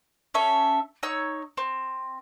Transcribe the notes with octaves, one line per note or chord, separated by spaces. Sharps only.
C#4 A4 E5
D#4 C#5 E6
C4